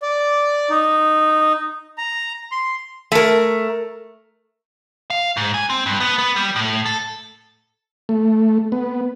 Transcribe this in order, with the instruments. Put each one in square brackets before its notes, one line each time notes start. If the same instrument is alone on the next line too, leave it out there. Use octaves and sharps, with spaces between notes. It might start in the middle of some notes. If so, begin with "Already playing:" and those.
[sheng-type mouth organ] D5
D#4
A#5
C6
[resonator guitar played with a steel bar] A3 A#4
[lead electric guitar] F5
G#2
G#5
C4
G2
B3
B3
G3
A2
A4
[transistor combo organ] A3
B3